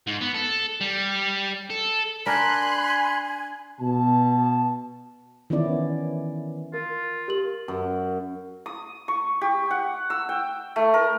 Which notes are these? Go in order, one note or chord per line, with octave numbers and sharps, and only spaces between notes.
G#2
B3
A4
G3
A4
D4 A#4 G#5 B5 C6 F#6
B2 A5
D#3 E3 B3 C#4 E4 D5
F4 A#4
G4 A#4 F#7
F#2
D#6
C#6
G4
F#5
E6
G5
A3
A#4